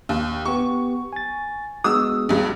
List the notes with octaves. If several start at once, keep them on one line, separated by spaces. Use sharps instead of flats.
D#2
B3 G4 C#6
G#5 A6
G#3 B3 F#4 D#6 E6
C#2 G2